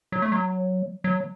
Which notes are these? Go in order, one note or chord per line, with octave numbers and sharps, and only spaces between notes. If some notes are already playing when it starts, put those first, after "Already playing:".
F#3
A3
F#3
F#3